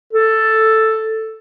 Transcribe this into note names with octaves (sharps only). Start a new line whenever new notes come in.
A4